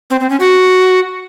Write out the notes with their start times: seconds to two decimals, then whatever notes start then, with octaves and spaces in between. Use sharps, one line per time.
0.10 C4
0.20 C4
0.29 C#4
0.40 F#4